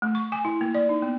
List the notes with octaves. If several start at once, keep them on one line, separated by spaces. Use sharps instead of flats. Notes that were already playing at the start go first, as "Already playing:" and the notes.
A3
C#6
G#5
E4
A#3
D5
D#4
B3